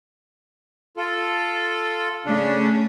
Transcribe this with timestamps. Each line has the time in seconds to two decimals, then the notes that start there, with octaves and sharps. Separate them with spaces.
0.97 F4 A4
2.26 C#3 A3 C#4 D4